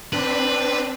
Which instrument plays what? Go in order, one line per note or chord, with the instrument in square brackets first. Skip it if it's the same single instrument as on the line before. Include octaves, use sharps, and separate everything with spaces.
[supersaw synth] C4 D4 [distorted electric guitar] B4